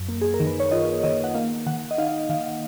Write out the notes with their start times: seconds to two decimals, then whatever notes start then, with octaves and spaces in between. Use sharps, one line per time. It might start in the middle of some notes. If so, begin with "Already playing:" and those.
Already playing: F#2
0.09 A#3
0.21 G#4
0.34 A#4
0.40 D#3
0.46 B4
0.60 C#5
0.71 F4 D#5
1.04 D#3 D#5
1.24 F#5
1.34 A#3 F5
1.66 D#3 F#5
1.91 D#5
1.98 D#4 F5
2.29 D#3 F5